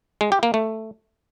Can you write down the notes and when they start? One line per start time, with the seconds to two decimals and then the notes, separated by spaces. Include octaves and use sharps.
0.21 G#3
0.32 G4
0.43 A#3
0.54 A3